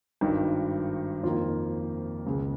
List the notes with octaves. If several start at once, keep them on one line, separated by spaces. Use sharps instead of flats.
G#1 G2 D#3 G4
F2 D#3 A#3 F4
C#2 C#3 G#3